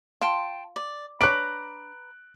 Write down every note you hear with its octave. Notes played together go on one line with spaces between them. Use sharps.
F4 G5 A5 C6
D5
D4 B4 C#5 A#5 D6 F#6 D7